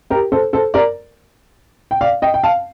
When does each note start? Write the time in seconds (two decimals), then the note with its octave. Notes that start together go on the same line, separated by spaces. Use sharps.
0.10 G4 A#4
0.32 A4 C5
0.53 A4 C5
0.74 A#4 D5
1.91 G5
2.01 D5 F5
2.22 D#5 G5
2.34 G5
2.44 F5 A5